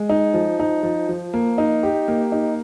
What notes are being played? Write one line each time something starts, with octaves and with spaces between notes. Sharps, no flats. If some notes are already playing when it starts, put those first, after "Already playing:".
Already playing: G#3
D#4
F3
D#4
F3
F3
A#3
D#4
G4
A#3
D#4